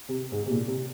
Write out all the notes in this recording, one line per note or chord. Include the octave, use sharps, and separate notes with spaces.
C3
G#2
C3
A#2
C3